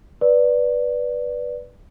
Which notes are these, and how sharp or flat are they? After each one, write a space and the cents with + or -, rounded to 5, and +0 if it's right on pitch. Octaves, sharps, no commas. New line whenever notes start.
B4 -5 D5 +0